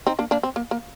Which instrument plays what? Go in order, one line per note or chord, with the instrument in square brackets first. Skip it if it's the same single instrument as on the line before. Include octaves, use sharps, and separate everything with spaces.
[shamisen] C4 D#4
A#3 D4
A#3 D4
C4
A#3
A#3